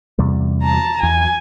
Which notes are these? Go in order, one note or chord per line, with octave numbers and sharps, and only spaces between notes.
E2 C3 G3
A5 A#5
E2 G#5